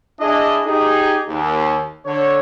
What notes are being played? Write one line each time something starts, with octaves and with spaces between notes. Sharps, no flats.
D4 E4 G#4 D#5
D#4 G4 G#4
D#2
D3 C#5